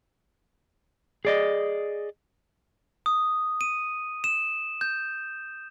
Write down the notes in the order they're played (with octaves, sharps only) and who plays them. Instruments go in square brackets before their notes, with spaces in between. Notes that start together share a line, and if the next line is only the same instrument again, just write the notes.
[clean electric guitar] G#4 D5 D#5
[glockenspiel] D#6
D#7
E7
G6